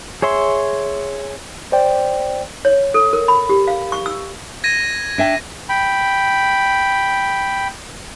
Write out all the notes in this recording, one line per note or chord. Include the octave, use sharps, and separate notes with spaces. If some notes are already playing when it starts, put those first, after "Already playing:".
G#4 C#5 E5 C6
C5 D5 G5
C#5
A4
A#4
B5
G4
F5
C#6
E6
G#6 A#6 D#7
D4 E5 G5
G5 B5